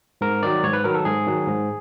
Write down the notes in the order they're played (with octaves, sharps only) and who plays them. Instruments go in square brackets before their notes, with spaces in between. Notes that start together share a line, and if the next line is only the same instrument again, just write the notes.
[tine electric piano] G#2 A#4
D#3 F#3 D5
G#2 C#5
B4
D#3 F#3 A#4
A4
G#2 G#4
D#3 F#3
G#2